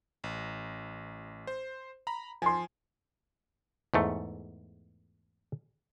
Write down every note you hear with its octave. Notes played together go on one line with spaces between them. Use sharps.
A1
C5
A#5 B5
F3 G#5 C6
E2 G#2 A3